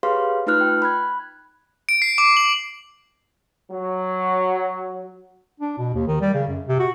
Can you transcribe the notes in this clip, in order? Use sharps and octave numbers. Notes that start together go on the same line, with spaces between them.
G4 G#4 B4 C#5 F5 C6
A3 D#4 F4 B4 F6 F#6
G5
B5 F#6 G#6
D7
C7
D6
F#7
F#3
D4
B2
D#2
D#3
G3
C#3
F#2
C3
F#4